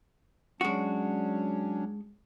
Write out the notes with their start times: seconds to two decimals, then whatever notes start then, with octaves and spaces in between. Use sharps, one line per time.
0.61 F#3 G#3 C#4 D4 F#4